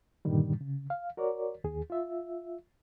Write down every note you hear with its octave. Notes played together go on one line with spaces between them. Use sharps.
G2 A#2 D3 D#3 G3
C#3
F5
F#4 A#4 C#5 D5
D#2 G#4
F4 E5